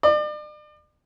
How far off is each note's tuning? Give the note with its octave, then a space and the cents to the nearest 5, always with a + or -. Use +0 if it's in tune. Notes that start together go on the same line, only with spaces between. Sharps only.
D5 +40